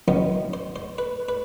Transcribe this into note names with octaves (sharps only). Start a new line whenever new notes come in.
F#2 D#3 F#3 B3 C5
C5
C5
B4
B4